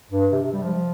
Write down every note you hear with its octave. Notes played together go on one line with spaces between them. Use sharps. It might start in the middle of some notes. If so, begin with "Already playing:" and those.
G2
C3
C3
G3
F3